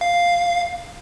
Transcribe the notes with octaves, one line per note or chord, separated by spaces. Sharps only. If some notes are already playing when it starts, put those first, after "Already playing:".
F5